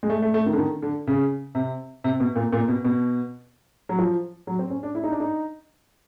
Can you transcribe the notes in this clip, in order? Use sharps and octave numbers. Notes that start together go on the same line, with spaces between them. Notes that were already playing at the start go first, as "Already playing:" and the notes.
G#3
A3
A3
A3
D#3
D3
D#3
D3
C#3
C3
C3
B2
A#2
A#2
B2
B2
F#3
F3
F#3
C4
C#4
D4
E4
D#4
D4
D#4